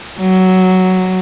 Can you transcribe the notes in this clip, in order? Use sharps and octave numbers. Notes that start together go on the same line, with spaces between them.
F#3